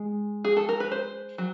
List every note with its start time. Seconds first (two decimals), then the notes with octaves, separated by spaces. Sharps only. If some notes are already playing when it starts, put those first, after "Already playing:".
Already playing: G#3
0.44 G#4
0.57 A4
0.69 A#4
0.80 B4
0.91 C5
1.38 F#3